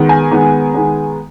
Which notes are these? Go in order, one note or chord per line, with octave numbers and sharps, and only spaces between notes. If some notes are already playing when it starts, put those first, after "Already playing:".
Already playing: D#3 G#3 B3
G#5
D#3 G#3 B3
D#3 G#3 B3